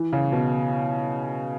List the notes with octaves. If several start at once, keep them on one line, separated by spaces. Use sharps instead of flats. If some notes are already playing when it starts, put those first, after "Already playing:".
Already playing: E3
C#3
B2